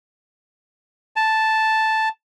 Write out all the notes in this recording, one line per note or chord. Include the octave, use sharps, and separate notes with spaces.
A5